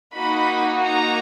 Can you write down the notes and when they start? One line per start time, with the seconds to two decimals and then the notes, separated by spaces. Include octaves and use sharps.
0.14 A#3 D#4 F#4 B5
0.87 A#5